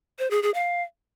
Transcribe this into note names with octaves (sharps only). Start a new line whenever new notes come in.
C5
G#4
G#4
F5